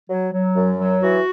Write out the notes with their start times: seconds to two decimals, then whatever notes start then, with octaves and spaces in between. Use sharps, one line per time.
0.10 F#3
0.33 F#3
0.56 F#2
0.79 F#3
1.02 E3 F#4